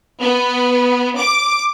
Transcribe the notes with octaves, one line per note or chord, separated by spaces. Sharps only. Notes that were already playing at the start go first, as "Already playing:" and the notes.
B3
D6